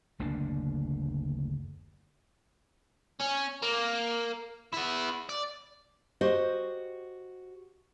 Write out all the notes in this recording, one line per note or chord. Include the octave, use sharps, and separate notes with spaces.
F#1 D2 A#3 D4
C#4
A#3
B3 E4
D5
F#4 G4 C5 D#5